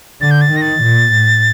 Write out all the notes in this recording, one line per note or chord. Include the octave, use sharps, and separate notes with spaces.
D3 A6
G6
A6
D#3 A#6
A6
A#2
A2